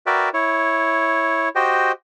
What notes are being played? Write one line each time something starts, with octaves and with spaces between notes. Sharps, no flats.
F#4 A#4 B4 D5 E5 G5
E4 C#5
F#4 G4 C5 D#5 G5